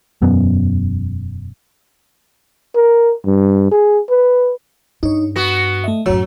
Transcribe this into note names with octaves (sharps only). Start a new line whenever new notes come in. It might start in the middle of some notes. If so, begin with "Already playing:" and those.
E1 F#2 B3
A#4
G2
G#4
B4
G2 D#4 C#5
B3 F#4 A#6
A3 D#5 E5
A1 F#2 F#3 F#4 C#5 E6